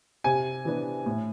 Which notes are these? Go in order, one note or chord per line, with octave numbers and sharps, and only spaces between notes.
C3 G#5
E3 B3 D4
A2